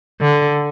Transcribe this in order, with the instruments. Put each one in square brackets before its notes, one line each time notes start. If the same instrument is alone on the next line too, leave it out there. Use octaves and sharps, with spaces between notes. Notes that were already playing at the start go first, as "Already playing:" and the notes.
[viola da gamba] D3